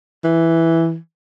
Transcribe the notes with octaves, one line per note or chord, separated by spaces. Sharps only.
E3